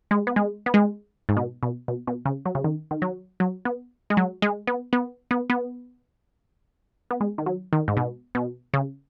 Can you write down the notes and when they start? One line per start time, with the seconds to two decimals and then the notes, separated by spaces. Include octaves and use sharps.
0.11 G#3
0.27 B3
0.36 G#3
0.66 B3
0.74 G#3
1.29 G#2
1.37 B2
1.63 B2
1.88 B2
2.07 B2
2.26 C#3
2.46 F#3
2.55 C#3
2.64 D#3
2.91 D#3
3.02 F#3
3.40 F#3
3.65 B3
4.10 G#3
4.17 F#3
4.42 G#3
4.67 B3
4.93 B3
5.31 B3
5.50 B3
7.11 B3
7.21 G#3
7.38 D#3
7.46 F#3
7.73 D#3
7.88 G#2
7.97 B2
8.35 B2
8.74 C#3